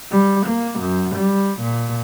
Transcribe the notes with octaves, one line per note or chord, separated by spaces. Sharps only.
G3
A#3
F#2
G3
A#2